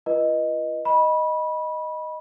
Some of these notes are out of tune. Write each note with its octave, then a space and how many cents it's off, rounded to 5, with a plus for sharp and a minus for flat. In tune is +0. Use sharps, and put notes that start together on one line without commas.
F4 -40 B4 -30 D#5 +0
D#5 +0 B5 -20